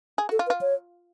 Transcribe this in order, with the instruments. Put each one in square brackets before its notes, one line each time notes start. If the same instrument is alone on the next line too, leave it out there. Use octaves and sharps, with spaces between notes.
[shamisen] G#4
F#4
[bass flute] A4
[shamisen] F4
[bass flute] B4
[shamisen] F4
[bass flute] C#5